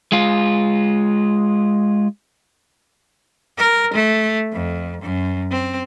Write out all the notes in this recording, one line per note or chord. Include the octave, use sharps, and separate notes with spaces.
G#3 F4
A#4
A3
F2
F#2
C4